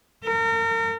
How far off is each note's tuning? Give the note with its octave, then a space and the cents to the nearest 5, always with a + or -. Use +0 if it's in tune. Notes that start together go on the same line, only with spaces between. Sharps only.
A#4 -35